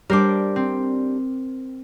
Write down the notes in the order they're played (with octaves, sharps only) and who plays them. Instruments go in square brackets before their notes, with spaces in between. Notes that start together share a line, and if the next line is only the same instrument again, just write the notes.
[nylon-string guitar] G3 D4 [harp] A#4 C5 D6
[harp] C4